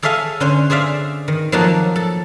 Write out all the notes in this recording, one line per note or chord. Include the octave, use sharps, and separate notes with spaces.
G#4 A4 C#5 E5 F5 G#5
D3 C#4 C5
G#4 C5 D5 E5 F5
D#3
F3 F#3 A#3 D#4 F#4 A4
A4